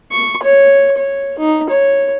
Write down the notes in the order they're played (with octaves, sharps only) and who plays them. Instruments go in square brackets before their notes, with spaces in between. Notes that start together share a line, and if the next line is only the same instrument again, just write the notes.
[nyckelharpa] C#6
C#5
C#5
D#4
C#5